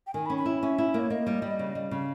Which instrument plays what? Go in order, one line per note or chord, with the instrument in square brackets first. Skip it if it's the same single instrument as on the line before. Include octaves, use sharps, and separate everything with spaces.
[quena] G5
[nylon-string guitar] D#3 [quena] G#5
[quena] B5
[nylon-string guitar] C#4
[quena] B5
[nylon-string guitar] E4
[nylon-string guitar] C#4 [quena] E5
[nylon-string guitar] E4
[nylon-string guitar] A#3 [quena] C#5
[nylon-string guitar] A#3 [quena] D#5
[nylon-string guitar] G3
G3
C#3
G3
C#3